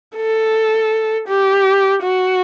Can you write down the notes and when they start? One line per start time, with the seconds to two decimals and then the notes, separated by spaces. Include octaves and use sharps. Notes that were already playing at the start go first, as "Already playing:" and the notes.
0.16 A4
1.28 G4
2.02 F#4